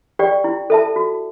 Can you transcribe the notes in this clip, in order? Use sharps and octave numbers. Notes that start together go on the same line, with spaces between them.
G4 D5 G5
E4
A4 E5 A5
F#4